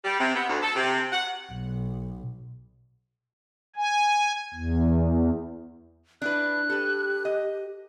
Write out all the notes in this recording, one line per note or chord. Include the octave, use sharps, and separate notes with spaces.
G3
C3
B3
D2
A4
C3
F#5
B1
G#5
E2
D4 E4 B4 F#6
G4 A4 B4
D#5